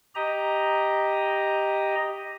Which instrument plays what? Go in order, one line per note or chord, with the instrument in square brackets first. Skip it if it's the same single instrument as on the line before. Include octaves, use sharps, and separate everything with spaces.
[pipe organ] G4 D#5 A#5